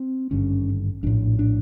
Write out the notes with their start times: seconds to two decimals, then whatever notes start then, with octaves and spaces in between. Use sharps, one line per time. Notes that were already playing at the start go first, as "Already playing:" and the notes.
Already playing: C4
0.31 G#1 G2 D3 C#4
1.03 A#1 A2 D4
1.39 D4